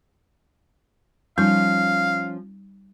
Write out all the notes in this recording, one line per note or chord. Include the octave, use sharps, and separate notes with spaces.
F3 G3 C#4 D#4 F5